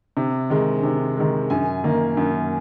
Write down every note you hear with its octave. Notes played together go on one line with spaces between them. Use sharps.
C3
D#3 G#3
C3
D#3 G#3
F#2 G#5
D#3 A#3
F#2